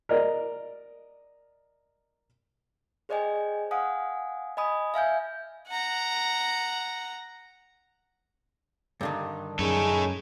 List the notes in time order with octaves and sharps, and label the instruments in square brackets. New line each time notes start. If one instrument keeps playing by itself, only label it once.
[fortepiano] A#4 D5 D#5
[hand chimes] G#4 C5 D5 D#5 G5 G#5
F5 F#5 G#5 D#6
D#5 G#5 B5 D#6
E5 F5 G#5 G6
[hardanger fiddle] F#5 A#5
[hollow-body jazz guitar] G2 D3 D#3
[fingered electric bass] F#2 [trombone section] C#3 D#4 G#4 [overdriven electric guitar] A4 C#5